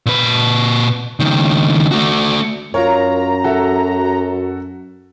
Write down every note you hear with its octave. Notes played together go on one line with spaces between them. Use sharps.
A#2 B4
C#2 D#3
A3 F#4
F#2 F4 A#4 C#5 A#5
F#4 A4 E5